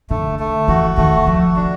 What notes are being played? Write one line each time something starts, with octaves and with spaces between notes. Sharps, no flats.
D3 A3
A3
E3 F#4
D#3 A3
F3 F#4
D4